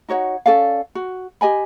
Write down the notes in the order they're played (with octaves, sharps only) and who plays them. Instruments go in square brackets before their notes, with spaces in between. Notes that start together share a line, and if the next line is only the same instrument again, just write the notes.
[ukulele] D#4 F#4 C#5 F#5
C#4 A4 D5 F5
F#4
G4 D#5 G#5 B5